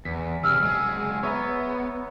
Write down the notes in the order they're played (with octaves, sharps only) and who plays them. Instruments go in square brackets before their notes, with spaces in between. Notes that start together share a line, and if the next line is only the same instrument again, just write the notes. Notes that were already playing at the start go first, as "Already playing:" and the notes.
[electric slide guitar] E2 [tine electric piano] B6
[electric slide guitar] C3 G3 G#4 [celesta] E6 F6
[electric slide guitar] F#3 G#4 [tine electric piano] G#3
[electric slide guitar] B3 [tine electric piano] C#5 E5 A#5